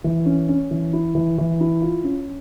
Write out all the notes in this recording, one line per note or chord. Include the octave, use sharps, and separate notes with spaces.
E3
C#4
C#4
E3
E4
E3
E3
E4
F4
C#4